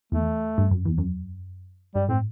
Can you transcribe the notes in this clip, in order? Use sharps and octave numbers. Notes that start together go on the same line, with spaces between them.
E2 A3
G2
F#2
E2
F#2
G2 G3
A2 C4